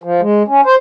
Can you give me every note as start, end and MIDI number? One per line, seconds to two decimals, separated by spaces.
0.03 0.21 53
0.21 0.43 56
0.48 0.61 61
0.66 0.75 72